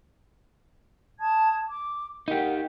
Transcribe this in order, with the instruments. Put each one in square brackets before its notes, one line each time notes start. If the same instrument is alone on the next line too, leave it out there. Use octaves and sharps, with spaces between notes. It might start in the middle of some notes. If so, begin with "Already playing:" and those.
[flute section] A5 D#6 G#6
D6
[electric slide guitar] D#4 G4 [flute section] A#4 F#5